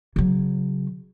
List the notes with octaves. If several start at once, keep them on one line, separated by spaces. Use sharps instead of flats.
C#3 F#3